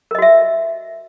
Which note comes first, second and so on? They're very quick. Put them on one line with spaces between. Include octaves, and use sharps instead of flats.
A#4 D#5 F#4 E5